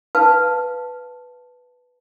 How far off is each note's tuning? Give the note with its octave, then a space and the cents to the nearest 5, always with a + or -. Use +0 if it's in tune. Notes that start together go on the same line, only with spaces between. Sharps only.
B4 +0 F5 +0 A5 +0